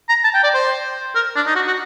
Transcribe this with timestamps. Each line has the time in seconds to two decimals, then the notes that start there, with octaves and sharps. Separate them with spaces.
0.09 A#5
0.24 A5
0.34 G5
0.43 D5
0.54 C5
1.15 A#4
1.36 D4
1.46 D#4
1.56 F#4
1.67 F#4